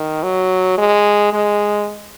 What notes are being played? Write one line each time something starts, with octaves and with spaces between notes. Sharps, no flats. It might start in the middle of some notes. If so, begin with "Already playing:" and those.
Already playing: D#3
F#3
G#3
G#3